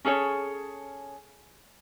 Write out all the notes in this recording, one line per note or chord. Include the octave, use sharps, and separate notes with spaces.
C#4 G#4 A4 C#5